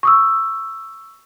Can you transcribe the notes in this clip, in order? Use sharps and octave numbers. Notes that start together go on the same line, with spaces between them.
C#6 D#6 E6